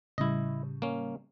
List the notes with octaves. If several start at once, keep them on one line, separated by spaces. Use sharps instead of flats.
A2 C#3 G3 E4 D#5
A#3 C#4